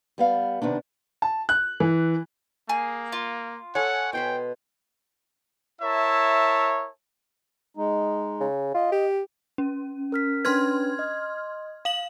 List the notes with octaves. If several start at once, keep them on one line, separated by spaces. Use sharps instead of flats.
G3 B3 F5
C3 D#3 B3 D4
A5
F#6
E3
A#3 G#4
F4
A4 C#5 F#5 G#5
B2 C5 G5 B5
E4 A#4 C#5 E5 A5
G#3 D#4
C#3
F4 D#5
G4
C#4
A#4 F6 B6
C#4 D4 B4 C6 F6 G#6
D#5
F5 F#7